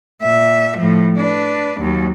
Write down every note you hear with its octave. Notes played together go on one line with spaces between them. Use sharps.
A#2 E5
A2 F3
D4 B4
D#2 F#3